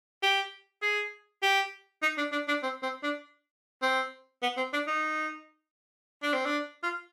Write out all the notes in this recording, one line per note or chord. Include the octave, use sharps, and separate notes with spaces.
G4
G#4
G4
D#4
D4
D4
D4
C4
C4
D4
C4
B3
C4
D4
D#4
D4
C4
D4
F4